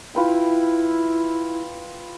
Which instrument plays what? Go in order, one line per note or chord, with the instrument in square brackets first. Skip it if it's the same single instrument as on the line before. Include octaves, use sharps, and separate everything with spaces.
[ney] E4 [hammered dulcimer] F4 B4 G5